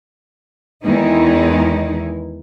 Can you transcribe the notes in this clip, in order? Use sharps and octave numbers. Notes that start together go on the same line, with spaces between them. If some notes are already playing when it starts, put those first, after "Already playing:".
E2 D#3 E3 G#3 D#4 E4